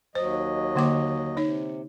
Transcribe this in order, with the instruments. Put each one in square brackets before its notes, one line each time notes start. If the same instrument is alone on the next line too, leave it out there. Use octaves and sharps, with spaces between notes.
[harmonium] D#2 F#3 D#5 [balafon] C5
[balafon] D3 A#3 D6
[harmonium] C3 [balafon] D#4 C#5